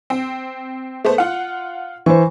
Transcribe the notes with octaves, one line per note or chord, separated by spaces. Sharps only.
C4
A3 B3 C5
F4 F#5
E3 C5 C#6